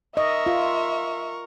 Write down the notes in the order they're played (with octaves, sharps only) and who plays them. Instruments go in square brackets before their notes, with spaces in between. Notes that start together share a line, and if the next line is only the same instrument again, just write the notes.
[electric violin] A#4 C#6 [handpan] D#5 [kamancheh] E5
[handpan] F4